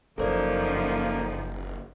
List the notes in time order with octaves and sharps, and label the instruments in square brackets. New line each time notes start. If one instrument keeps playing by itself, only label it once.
[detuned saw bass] F#1 [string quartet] F#2 F3 D#4 [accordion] A#3 [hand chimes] A4 C5 D5